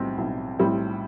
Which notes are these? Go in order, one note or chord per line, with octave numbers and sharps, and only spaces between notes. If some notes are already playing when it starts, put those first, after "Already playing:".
Already playing: B1 A2 G3 C4
B1
A2 G3 C4